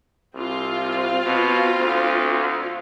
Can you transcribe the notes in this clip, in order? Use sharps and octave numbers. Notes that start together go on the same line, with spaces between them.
C2 C4 F4
B2
D2